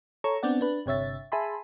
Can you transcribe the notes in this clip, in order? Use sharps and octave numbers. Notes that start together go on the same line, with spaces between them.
A4 C#5 A#5 C#6
B3 C4 D4 D5 F#5
D4 B4
G1 C3 C#5 E5 A6
G#4 E5 G#5 A5 B5 C6